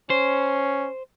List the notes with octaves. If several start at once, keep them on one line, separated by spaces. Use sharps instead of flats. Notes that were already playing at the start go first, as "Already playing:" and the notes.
C#4 C5